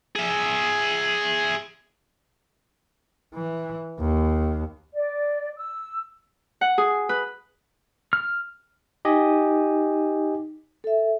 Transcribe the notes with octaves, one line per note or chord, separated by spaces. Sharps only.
G#4 E5
E3
D#2
D5
E6
F#5
G#4
B4
F6
D#4 G4 D#5 G#5
A4 E5